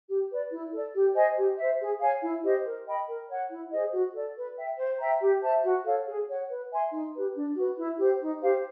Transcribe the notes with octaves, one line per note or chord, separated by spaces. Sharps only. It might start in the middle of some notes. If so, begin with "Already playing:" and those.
G4
B4 D5
E4
A4 D5
G4
C5 D#5 G#5
G4
C5 E5
G#4
C#5 F5 G#5
E4
G4 C5 D#5
A#4
D#5 G5 B5
A#4
C#5 F#5
E4
G#4 C5 D#5
F#4
A4 D5
B4
E5 G5
C5
E5 G5 A#5
G4
C5 E5 A5
F#4
A4 C#5 F5
G#4
C#5 F#5
B4
E5 G#5 C6
D#4
G4 B4
D4
F#4 B4
E4
G4 C5
D#4
G4 C5 F5